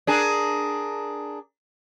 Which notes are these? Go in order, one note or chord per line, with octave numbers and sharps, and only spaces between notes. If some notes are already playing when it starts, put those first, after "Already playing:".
D4 G#4 A#4